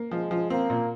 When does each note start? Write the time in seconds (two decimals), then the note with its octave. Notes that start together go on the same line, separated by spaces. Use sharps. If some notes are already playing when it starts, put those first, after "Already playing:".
Already playing: A#3
0.11 F3 G#3
0.31 F3
0.50 A#3 C4
0.70 A#2